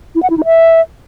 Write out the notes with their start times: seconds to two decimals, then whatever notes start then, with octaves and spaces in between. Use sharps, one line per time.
0.15 E4
0.22 F#5
0.30 E4
0.37 D#4
0.45 E5